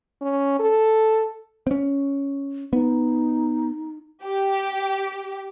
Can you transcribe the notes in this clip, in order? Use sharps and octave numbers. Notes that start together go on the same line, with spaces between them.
C#4
A4
C4 C#4
B3 D#4
G4